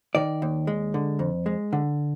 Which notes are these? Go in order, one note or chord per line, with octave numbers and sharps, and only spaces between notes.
D#3 D5
D#2
G#3
D3
F2
G#3
D3